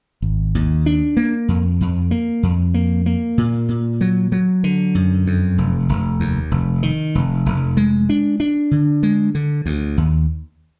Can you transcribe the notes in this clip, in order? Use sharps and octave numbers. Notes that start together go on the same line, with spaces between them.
G#1
D#2
D4
A#3
F2
F2
A#3
F2
A#3
A#3
A#2
A#2
F#3
F#3
D3
F#2
F2
F1
F1
D#2
F1
D#3
F1
F1
G#3
D4
D4
D3
G#3
D3
D2
D#2